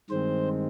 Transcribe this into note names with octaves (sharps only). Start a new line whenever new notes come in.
G2 D#3 G#3 C4 C5